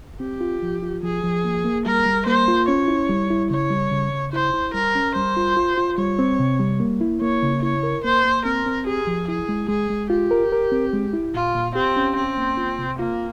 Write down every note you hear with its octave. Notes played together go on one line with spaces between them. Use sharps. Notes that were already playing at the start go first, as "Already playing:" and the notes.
C4 G4
F4
F3
F4
F3 G#4
F3
A#3
A#3
G3 A#4
G3
A#3 C5
F4
C#4 C#5
E4
G3
E4
C#3 C#5
G3
C#3
C#3
E4 C5
E4
G3 A#4
C#4
G3 C5
F4
F4
F4
G3 C#5
C4
C3
G3
A#3
E4
A#3 C#5
C#3
E4 C#5
A#4
A#3 C5
A#3
C4 A#4
C4
G4 G#4
F3
E4 G#4
G#3
G#3 G#4
G#3
F4 G4
A#4
A#4
C4
G#3
E4
A#2 F4
A#2
C4 G4
C#4
C4 C#4
A#3
F4
C3
A#3 F4